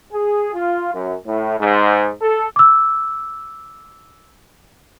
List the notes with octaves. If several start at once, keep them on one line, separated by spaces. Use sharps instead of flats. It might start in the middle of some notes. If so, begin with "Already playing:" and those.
G#4
F4
F#2
A2
G#2
A4
D6 E6